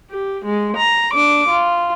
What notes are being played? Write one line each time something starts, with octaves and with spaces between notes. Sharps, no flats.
G4
G#3
A#5
D4 D6
F4